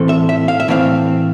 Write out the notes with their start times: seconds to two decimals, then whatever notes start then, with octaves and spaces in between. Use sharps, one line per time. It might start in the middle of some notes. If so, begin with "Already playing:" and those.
Already playing: A2 E3 A3 C4
0.09 E5
0.29 E5
0.48 F5
0.60 E5
0.68 A2 E3 A3 C4 F5